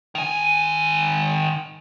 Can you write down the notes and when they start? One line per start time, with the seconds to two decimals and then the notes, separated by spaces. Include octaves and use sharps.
0.15 D#3 G#5